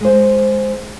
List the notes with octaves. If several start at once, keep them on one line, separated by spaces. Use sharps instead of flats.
G#3 C5